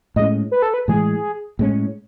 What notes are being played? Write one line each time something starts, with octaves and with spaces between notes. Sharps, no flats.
A2 G#3 C#4 D#5
B4
A4
B4
A2 E3 G#3 G#4
A2 G#3 C#4